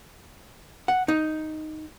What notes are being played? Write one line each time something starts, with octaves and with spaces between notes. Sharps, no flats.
F#5
D#4